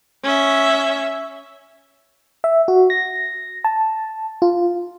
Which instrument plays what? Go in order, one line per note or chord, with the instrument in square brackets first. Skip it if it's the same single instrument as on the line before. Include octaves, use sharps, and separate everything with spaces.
[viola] C#4 E5
[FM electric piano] E5
F#4
A#6
A5
F4